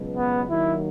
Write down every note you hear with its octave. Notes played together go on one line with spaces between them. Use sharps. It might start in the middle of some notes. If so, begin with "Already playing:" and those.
Already playing: C#2 B2 F#3
B3
D#2 D#3 F#3 E4